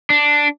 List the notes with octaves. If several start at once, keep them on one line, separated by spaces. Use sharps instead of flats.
D4